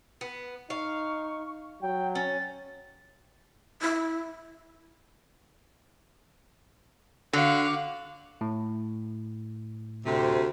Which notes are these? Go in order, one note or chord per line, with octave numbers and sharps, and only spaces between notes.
B3
D#4 F5 C#6
F#3 G5
C#4 A6
E4
D3 F#4 F5
A2
D2 C3